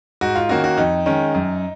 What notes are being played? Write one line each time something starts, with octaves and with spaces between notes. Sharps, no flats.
G#2 F#4
F4
D#3 A#3 C#4 F#4
F#4
F2 D#4
D#3 G#3 C#4
F#2